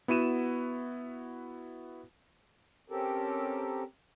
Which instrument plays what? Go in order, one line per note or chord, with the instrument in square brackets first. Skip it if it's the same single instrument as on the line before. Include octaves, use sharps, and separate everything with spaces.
[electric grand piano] B3 E4 F#4 D#7 E7
[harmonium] C4 C#4 G4 A4 A#4